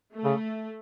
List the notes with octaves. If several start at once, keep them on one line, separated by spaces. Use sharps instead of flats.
A3
C#3